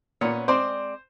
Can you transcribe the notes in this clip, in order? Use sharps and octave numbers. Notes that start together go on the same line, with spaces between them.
A#2 B3 C#4 C#5
G#3 C4 C5 D5